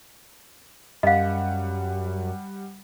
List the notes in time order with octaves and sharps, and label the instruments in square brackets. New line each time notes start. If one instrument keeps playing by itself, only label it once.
[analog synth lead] F#2 [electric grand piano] G3 F#5 [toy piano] D#5 F5